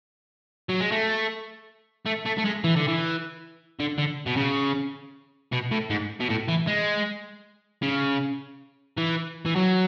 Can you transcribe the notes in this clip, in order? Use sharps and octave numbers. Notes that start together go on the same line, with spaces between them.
F#3
G#3
A3
A3
A3
A3
G#3
E3
D3
E3
D3
D3
B2
C#3
B2
A2
G#2
B2
A2
E3
G#3
C#3
E3
E3
F#3